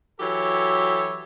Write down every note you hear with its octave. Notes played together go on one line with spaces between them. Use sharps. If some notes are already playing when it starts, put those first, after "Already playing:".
E3 F#3 G4 A4 C#5